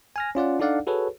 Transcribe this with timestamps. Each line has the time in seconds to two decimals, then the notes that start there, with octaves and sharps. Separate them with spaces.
0.16 G#5 F6 A#6
0.35 C#4 F4 D5 F#5
0.60 D4 D#4 A4 D5 F5 F#5
0.87 F#4 G#4 A4 B4 C#5